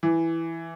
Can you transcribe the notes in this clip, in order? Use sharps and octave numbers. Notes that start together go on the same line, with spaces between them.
E3